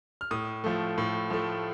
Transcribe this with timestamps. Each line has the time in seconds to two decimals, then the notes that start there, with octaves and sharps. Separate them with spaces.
0.21 F6
0.31 A2 D#6
0.64 F3 A3
0.98 A2
1.30 F3 A3